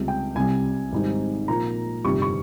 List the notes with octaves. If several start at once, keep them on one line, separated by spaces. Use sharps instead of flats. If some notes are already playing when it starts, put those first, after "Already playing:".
Already playing: C#2 C3 G3
G5
C2 C3 G3 G#5
G#1 G#2 G3 C4 D#4
A#2 F3 A#3 A#5
G1 F2 C3 D#3 G3 C#6
C#6